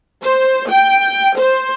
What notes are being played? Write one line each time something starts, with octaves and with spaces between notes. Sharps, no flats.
C5
G5
C5